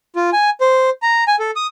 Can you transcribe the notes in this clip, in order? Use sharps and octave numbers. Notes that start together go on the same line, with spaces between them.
F4
G#5
C5
A#5
G#5
A4
D#6